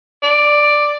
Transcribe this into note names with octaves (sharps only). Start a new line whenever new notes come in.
D5